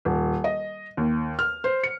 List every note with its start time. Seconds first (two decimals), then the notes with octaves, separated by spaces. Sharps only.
0.05 D#1
0.44 D#5
0.97 D#2
1.39 F6
1.64 C5
1.83 C#7